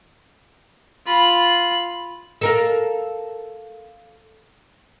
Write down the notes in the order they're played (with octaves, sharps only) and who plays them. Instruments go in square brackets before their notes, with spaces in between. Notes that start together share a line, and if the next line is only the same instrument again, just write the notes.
[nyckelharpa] F4 B5
[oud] A4 A#4 F5